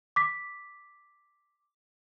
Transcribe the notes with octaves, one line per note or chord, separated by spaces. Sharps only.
D6 B6